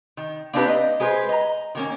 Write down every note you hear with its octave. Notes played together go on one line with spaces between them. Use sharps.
D#3
A#3 C4 D4 D#4 G4 B4
D#5
G#3 G#4 B4 C5
D#5 A#5
D#3 A#3 C#4